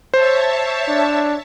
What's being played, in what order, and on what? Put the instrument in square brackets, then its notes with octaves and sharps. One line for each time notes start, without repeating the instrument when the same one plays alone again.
[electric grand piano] C5 [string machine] C#5 E5 A5
[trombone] D4